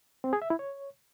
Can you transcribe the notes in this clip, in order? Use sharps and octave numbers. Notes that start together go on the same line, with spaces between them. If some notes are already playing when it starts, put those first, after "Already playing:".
C4
G#4
E5
E4
C#5